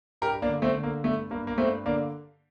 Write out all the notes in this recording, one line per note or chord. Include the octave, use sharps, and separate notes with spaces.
G2 G4 A#4
A#3 D4
D3
A3 C4
D3
A#3
G2 A3
G2 A#3
A#3
G2 A3 C4
D3 A#3 D4